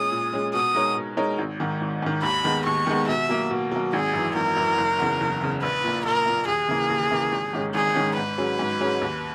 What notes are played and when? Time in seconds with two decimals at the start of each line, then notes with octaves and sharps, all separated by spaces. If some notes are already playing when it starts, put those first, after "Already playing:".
Already playing: A#2 G#3 C#4 G#4 D#6
0.12 A#2
0.33 G#3 C#4 G#4
0.54 B2 D#6
0.75 G#3 D#4 A#4 C#5
0.96 B2
1.17 G#3 D#4 A#4 C#5
1.38 G#1
1.60 G#2 D#3
1.81 G#1
2.02 G#2 D#3
2.23 D#2 B5
2.44 D#3 G#3 B3
2.66 D#2 C#6
2.87 D#3 G#3 B3
3.08 B2 E5
3.29 F#3 A#3
3.51 B2
3.72 F#3 A#3
3.93 G#1 G#4
4.14 F#2 E3
4.36 G#1 A#4
4.57 F#2 E3
4.78 F#1
4.99 E2 C#3
5.20 F#1
5.41 E2 C#3
5.62 A#1 B4
5.84 A#2 A#3
6.05 A#1 A#4
6.26 A#2 A#3
6.48 D#2 G#4
6.69 C#3 E3 A#3
6.90 D#2
7.11 C#3 E3 A#3
7.32 G#1
7.53 G#2 D#3 G#3 C#4
7.74 G#1 G#4
7.95 G#2 D#3 G#3 C#4
8.17 G#2 B4
8.38 F#3 C#4 G#4
8.59 G#2
8.81 F#3 C#4 G#4
9.02 D#2